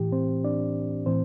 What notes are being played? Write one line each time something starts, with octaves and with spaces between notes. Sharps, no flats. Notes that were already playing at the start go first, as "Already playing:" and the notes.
Already playing: A2 E3 G4
C4 C5
D4 D5
A2 E3 C4 C5